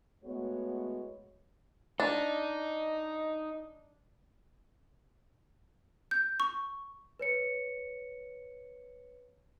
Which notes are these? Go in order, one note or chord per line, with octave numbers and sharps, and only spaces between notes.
A2 G#3 B3 F#4 C#5
D4 D#4
G6
C#6
B4 C#5 C#7